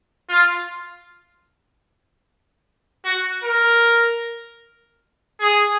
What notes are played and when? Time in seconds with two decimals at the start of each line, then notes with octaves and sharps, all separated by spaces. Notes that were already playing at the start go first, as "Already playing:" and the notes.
0.30 F4
3.05 F#4
3.44 A#4
5.41 G#4